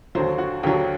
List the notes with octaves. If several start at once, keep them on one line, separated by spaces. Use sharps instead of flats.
D#2 D3 F#3 C5
F#4
D#2 D3 F#3 G4